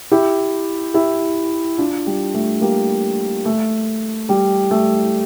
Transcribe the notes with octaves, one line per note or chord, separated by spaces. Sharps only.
E4 G4
E4 G4
D4 F4
G3
A3
G3 A#3
A3
G3
A3